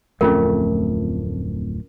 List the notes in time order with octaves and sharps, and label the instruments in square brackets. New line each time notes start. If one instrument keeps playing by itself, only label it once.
[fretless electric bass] D1 F2 A3 [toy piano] C#4 F4 A#4